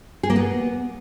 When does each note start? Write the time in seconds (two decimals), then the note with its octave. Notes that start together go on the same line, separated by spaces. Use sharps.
0.23 G#4
0.30 A#3
0.36 B3